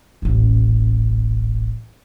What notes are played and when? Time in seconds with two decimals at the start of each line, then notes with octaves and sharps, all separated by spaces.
0.22 D#1 A1